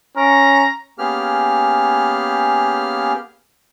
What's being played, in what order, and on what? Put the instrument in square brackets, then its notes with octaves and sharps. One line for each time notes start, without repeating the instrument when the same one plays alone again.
[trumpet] C#4 [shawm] A#5
[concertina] A#3 B3 C#4 G4 G#4 F6